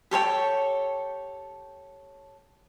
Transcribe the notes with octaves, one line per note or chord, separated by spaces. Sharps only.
G4 A4 C#5 G5